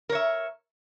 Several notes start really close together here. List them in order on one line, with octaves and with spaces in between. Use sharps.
A#4 C#5 E5